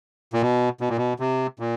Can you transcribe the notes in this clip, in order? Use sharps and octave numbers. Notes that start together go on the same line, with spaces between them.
A#2
B2
B2
A#2
B2
C3
A#2